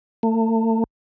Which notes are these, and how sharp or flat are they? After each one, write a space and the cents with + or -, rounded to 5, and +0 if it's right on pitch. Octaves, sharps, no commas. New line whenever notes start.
A3 +40